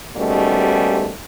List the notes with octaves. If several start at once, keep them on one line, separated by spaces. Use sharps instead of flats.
D#2 G#2 B2 G3 A3 C#4